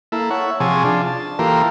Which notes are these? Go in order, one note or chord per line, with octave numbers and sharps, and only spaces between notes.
A#3 E4 A4
C#5 E5 F#5
C3 F3 G#4 G#5 A5 C#6
D4 F4
A5
E3 A#3 F4 G4 A4 A#4